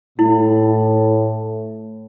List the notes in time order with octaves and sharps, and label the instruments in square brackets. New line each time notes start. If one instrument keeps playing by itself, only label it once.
[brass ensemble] A2 [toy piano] E4